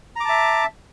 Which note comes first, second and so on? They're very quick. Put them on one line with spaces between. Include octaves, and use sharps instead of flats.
A#5 D6 A5 E5